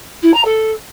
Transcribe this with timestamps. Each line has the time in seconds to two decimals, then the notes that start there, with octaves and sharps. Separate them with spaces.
0.22 E4
0.33 A#5
0.44 A4